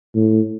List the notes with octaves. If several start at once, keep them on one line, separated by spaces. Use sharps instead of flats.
A2